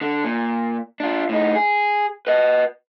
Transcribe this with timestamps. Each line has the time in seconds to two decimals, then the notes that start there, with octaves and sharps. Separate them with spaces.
0.01 D3
0.24 A#2
1.00 D4 F4
1.29 A2 D#4
1.55 G#4
2.27 B4 D#5